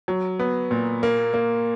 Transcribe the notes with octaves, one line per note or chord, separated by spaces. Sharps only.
F#3
B3
A#2
A#3
A#3